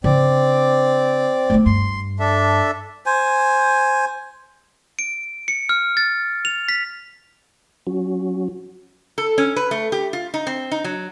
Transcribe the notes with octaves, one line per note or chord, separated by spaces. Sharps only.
C#3 C4 D4 D5
A3 B3
G2 C6
D4 A4 E5
C5 G#5
D7
C#7
F6
A6
F7
B6
F#3 C#4 F#4
A4
C#4
B4
A3
G4
F4
D#4
C4
D#4
F#3